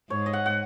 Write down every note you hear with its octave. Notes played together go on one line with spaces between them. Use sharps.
G#2 C#5
D#5
F#5
F#5